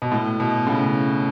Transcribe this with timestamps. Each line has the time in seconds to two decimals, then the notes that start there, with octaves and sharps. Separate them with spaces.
0.02 B2
0.12 A2
0.40 B2
0.67 A2 C#3